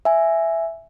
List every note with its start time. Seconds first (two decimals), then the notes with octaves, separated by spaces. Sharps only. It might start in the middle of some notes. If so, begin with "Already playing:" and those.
0.05 E5 G#5